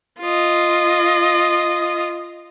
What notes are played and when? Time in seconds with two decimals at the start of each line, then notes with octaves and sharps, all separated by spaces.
0.20 F4 D#5